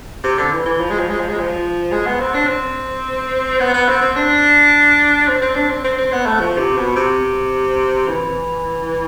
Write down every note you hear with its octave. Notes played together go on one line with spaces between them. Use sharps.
C3
D3
E3
E3
F3
G#3
F3
G#3
F3
G#3
F3
G#3
B3
C4
D4
C4
B3
B3
C4
C4
D4
C4
C4
D4
C4
C4
C4
B3
A3
F3
C3
B2
C3
E3